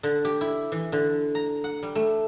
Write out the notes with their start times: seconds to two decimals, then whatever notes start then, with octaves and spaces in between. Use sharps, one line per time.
0.03 D3
0.25 G4
0.41 E4
0.72 E3
0.92 D3
1.35 A#5
1.64 F#5
1.83 G3
1.95 A3